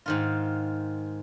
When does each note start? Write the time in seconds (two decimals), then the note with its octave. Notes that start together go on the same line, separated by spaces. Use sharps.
0.06 G#2 D#3 F4